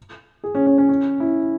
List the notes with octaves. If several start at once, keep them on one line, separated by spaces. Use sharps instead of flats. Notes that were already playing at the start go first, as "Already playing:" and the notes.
G#4
C#4
C#4
C#4
C#4
E4